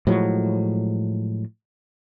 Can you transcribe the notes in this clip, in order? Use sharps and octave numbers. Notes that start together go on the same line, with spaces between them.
A2 F3 F#3 G#3